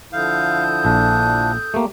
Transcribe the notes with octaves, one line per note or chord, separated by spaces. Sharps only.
D3 F3 E4 A4 F5 D#6 G6
A#1 D4
A3 A#3 G4